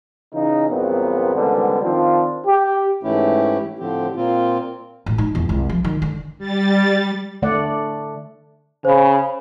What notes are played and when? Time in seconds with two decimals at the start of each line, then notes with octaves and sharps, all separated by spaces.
0.34 C#3 E3 D#4
0.69 E2 G2 A#2 F#3 B3 C4
1.35 C#2 G#2 D3 D#3 G3 B3
1.83 D#3 F3 C4 D4 F4
2.47 G4
3.03 G#2 E3 A3 C#4 E4 G4
3.79 A2 D3 F3 C4 G4
4.16 A#2 A#3 C4 F4
5.06 A1
5.18 D#4
5.35 E2
5.49 C2
5.69 F3
5.84 D#3
6.02 D3
6.38 G3 A6
7.42 D3 A3 D5 F#5
8.85 C#3 C5 B5